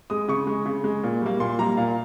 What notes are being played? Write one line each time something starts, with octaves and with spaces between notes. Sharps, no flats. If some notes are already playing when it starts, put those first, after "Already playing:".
G#3 D#6
C#3 C#6
G#3
C#3
G#3
A#2
G3 A#3
A#2 C6
G3 A#3 A#5
A#2 F5